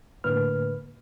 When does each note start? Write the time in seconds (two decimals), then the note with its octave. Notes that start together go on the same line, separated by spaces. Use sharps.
0.24 A2 D3 A#3 B4 F6